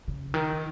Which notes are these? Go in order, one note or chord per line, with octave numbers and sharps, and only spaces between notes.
C#3
D#3